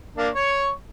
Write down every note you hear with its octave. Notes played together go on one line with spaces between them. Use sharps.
A#3 D4
C#5 C#6